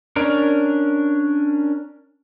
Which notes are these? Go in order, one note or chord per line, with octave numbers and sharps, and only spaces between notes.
C#4 D4 A#4